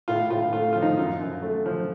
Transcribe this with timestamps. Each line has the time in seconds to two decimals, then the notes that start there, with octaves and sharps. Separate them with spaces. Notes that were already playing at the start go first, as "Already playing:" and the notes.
0.08 A2 F4
0.30 A2 F4
0.53 A3 F4
0.73 F3 F4
0.82 D#4
0.98 F#2 F4
1.21 F#2
1.42 A3
1.66 F3